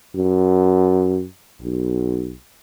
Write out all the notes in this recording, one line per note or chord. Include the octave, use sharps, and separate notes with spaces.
F#2
B1